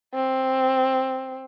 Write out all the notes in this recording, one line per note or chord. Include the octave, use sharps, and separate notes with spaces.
C4